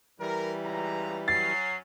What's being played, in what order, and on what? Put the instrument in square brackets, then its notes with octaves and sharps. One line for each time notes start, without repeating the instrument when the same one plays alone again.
[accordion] E3 G3 [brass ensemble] A#4
[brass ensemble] C#2 A#5
[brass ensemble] F#3 C#4 [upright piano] A6 [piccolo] C7